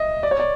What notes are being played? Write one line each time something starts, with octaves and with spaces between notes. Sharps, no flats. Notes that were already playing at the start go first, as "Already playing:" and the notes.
Already playing: D#5 E5
D5
C#5
D5